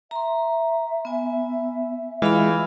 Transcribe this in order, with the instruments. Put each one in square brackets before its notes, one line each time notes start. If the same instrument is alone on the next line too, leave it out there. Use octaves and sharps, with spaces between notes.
[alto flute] E5 [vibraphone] A#5 C6
[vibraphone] B3 G#5
[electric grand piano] E3 [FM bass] G#3 [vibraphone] F4 F5 B5